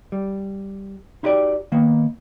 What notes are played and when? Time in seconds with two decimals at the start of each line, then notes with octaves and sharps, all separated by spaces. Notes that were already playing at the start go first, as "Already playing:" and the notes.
0.12 G3
1.23 D#4 E4 F#4 G4 D5
1.72 D#3 A#3 B3